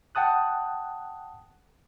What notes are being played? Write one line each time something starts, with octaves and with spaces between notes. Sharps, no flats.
F#5 G5 A5 D#6 F#6